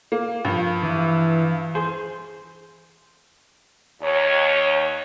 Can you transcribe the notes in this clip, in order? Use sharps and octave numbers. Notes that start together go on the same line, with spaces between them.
A#3
G2 F3
E3
G#4 C5
D#2 C#5